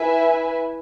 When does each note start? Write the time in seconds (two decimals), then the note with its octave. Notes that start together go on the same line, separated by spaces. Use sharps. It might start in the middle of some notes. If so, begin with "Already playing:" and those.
Already playing: E4 B4 E5 G#5